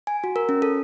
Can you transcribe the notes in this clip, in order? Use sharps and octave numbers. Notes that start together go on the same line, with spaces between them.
G#5
F#4
A#4
C#4
A4